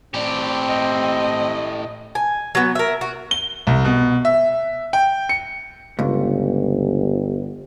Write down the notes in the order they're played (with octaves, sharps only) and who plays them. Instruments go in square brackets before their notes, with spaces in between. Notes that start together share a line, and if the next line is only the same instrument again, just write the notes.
[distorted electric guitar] A2 G4 [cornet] C4 [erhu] D5
[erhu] D#5
[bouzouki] G#5
F#3 B3
A#4 E5
F#4
[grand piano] G7
C2
B2
E5
G5
C#7
[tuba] G1 [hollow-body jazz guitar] C#2